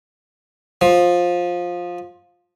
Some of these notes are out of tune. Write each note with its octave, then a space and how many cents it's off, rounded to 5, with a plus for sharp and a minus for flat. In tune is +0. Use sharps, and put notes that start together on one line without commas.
F3 +15